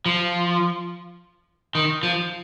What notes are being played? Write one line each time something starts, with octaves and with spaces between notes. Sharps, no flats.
F3
D#3
F3